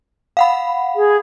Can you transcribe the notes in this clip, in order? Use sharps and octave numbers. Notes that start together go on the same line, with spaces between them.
F5 F#5 B5
G#4